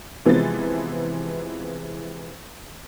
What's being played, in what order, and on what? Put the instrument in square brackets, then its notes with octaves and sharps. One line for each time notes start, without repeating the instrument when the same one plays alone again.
[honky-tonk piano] C3 E3 F3 G#3 B3 A6